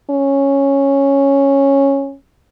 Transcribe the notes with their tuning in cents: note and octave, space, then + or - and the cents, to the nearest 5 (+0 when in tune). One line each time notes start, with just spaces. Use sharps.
C#4 -5